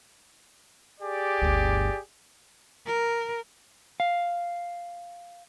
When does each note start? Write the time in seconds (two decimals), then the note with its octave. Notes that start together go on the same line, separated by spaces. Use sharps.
1.01 G4 G#4 D5
1.42 G1 D2
2.86 A#4
4.00 F5